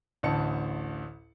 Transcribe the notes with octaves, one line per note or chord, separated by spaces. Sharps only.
A1 D2 A5 C#7